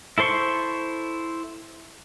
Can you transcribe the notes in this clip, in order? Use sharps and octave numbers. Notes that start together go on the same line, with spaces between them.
E4 A4 C5 C6 C#6